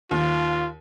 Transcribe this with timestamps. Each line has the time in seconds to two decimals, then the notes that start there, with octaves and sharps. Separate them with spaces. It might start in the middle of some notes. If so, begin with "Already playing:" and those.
0.11 D#2 F4